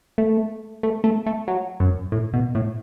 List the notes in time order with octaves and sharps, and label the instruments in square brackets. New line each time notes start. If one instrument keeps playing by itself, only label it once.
[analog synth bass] A3
A3
A3
A3
F#3
F#2
A2
B2
A2